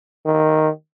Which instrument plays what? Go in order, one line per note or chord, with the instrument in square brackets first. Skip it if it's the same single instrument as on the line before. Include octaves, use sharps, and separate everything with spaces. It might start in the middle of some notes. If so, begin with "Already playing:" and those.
[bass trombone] D#3